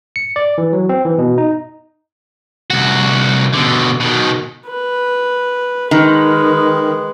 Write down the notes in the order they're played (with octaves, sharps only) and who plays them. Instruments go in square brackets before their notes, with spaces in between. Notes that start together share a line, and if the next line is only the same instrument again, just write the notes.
[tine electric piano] C#7
D5
E3
F#3
C4
E3
B2
D#4
[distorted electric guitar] C2 F#4
B2 D3
B2 D#3
[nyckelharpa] B4
[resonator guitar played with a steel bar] D#3 [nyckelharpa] G#3 B4